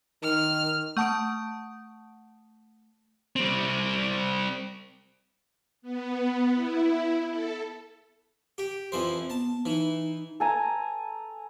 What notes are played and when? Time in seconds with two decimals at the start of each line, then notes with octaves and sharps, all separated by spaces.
0.23 D#3 F6
0.97 A3 F#5 A5 D#6 D7
3.36 G3 C4
5.82 B3
6.55 E4
7.29 A4
8.58 G4
8.92 F2 E3 C5
9.30 B3 A5
9.66 E3 D#4
10.40 A4 G#5 A#5